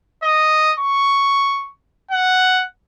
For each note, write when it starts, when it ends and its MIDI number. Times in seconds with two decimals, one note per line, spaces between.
0.23 0.73 75
0.80 1.71 85
2.11 2.64 78